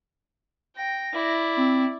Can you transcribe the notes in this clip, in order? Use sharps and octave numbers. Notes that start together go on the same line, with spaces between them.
G5 A#6
E4 D5
C4